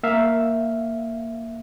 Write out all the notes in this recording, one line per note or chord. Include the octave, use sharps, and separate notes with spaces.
A#3 E5 F5